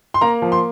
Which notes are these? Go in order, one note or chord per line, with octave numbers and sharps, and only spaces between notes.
C6
A#3 A#5
F3
C6